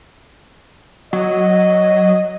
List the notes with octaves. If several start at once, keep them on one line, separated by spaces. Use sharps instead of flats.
F#3 D#5